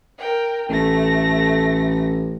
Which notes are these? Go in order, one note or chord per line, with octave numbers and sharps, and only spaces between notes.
A#4 G5
A1 A3 A#6